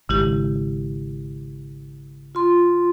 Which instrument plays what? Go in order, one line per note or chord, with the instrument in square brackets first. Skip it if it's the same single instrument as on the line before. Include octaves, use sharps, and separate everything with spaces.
[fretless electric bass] G#1 [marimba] C#3 E4 G4
[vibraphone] F4 C6